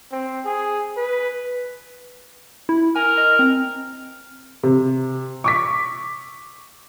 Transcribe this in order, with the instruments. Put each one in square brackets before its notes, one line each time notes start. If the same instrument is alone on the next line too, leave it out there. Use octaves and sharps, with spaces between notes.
[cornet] C4
G#4
B4
[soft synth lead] E4
[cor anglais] A#4 [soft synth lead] G#5
[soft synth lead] D#5
C4
[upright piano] C3
C#6 D6 B6